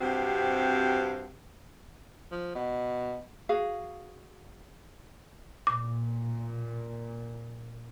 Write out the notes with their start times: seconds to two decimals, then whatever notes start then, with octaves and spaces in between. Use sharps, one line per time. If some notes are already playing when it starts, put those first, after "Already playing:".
0.01 G2 C3 C4 F#4 G4
2.32 F3
2.55 B2
3.49 F#4 G#4 F5
5.67 A#2 D6